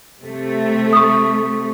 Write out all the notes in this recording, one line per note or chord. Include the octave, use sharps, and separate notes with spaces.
C3 A3
C#6 D#6